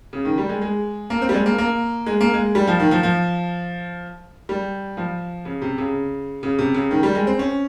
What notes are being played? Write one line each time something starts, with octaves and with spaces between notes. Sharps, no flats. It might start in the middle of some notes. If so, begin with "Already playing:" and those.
C#3
D#3
G3
G#3
G#3
A#3
C4
G3
G#3
A#3
A#3
G#3
A#3
G#3
G3
F3
D#3
F3
F3
G3
F3
C#3
C3
C#3
C#3
C3
C#3
D#3
G3
G#3
C4
C#4